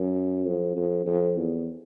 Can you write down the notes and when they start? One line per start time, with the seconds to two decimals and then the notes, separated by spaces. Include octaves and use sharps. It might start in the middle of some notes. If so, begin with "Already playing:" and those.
Already playing: F#2
0.47 F2
0.76 F2
1.06 F2
1.37 E2